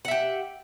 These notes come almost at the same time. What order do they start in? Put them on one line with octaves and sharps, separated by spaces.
F#5 E5 G4